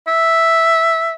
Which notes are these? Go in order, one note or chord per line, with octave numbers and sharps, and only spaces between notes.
E5